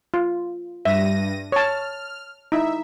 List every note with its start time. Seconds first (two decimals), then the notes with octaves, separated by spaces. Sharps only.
0.14 F4
0.85 G2 E5 A#6 D#7
1.52 C#5 A5 F6
2.52 D#4 E4 E5